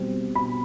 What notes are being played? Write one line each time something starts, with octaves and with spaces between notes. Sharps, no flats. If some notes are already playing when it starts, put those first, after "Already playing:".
Already playing: B2 G3 C4
B2 B5